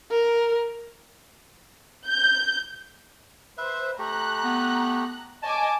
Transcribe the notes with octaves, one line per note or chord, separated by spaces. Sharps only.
A#4
G6
B4 C5 E5
A3 G4 A#5 F#6
B3
C#5 D#5 G#5 A5 D6